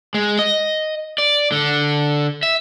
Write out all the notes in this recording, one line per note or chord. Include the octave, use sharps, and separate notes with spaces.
G#3
D#5
D5
D3
E5